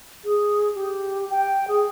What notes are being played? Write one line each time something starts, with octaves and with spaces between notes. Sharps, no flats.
G#4
G4
G5
G#4